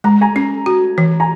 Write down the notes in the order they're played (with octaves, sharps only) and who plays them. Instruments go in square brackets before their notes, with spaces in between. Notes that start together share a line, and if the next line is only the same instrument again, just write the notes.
[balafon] G#3 [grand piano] A#5
[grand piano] G#5 A#5
[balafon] C#4
F#4
E3
[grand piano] G#5 A#5